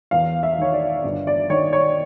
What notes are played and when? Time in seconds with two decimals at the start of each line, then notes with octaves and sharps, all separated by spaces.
0.11 E2 F5
0.43 E5
0.58 D#3 C#5
0.73 D5
1.04 G1
1.27 D5
1.50 D#3 C#5
1.73 C#5